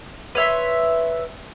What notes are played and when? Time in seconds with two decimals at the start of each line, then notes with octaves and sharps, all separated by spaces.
0.35 B4 C#5 E5 C6